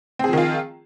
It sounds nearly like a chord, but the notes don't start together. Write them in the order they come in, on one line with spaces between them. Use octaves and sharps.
C4 G#4 F3 D#3 F4